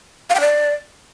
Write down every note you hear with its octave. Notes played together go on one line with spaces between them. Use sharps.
F5
G5
D5